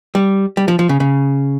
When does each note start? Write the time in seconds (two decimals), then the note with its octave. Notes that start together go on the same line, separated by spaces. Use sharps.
0.15 G3
0.57 G3
0.68 F3
0.79 F3
0.89 C#3
1.00 C#3